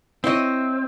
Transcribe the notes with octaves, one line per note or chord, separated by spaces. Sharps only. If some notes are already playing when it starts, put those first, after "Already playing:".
C4 E4 C#5 D#5